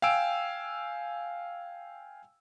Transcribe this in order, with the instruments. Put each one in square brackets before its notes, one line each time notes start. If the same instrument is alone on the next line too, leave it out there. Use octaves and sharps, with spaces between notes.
[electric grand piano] F5 G5 G#5 E6 D7